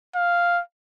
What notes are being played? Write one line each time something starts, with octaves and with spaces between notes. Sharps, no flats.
F5